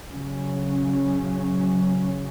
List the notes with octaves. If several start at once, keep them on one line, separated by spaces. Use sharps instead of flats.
C#3 F#3 C#4